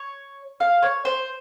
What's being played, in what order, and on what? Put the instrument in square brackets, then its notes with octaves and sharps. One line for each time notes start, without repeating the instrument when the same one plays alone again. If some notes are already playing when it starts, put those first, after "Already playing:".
Already playing: [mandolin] C#5
F5
C#5
C5